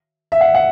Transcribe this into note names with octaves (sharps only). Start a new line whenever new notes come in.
E5
F#5
F#5